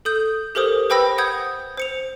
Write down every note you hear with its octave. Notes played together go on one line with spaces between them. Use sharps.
A4 D#6 G6
G4 A4 A#4 C5 D#6
B4 C5 G5 B5 E6 A#6
F#5 D#6 G6 G#6
C5 C#7 F7